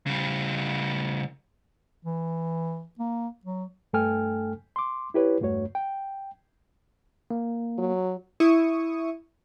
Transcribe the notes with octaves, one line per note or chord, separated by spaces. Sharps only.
C#3 G3
E3
A#3
F#3
G2 A3 A4 G5 G#5 F6
C6 D6
E4 G4 B4 C#5
E2 G2 A3 F#4 C#5
G5
A#3
F#3
E4 C#6 D#6